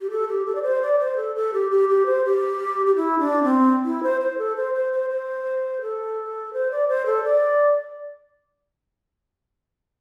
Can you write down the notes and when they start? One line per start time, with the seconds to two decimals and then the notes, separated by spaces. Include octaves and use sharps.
0.01 G4
0.11 A4
0.29 G4
0.46 A4
0.55 D5
0.63 C5
0.82 D5
0.99 C5
1.17 A4
1.35 A4
1.54 G4
1.71 G4
1.89 G4
2.06 C5
2.25 G4
2.86 G4
2.96 E4
3.19 D4
3.44 C4
3.85 E4
4.03 C5
4.21 C5
4.38 A4
4.56 C5
4.74 C5
4.93 C5
5.10 C5
5.82 A4
6.53 C5
6.71 D5
6.88 C5
7.06 A4
7.24 D5